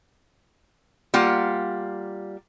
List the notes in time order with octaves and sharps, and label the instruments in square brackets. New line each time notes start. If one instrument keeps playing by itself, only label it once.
[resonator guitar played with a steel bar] G3 A#3 F4 F#5